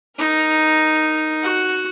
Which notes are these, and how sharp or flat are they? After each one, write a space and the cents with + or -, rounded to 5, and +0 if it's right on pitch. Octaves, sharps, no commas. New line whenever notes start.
D#4 +0 A#4 +0
F#4 +0 F#5 +0